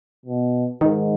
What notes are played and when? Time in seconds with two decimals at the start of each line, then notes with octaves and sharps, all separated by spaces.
0.26 B2
0.81 G#2 D#3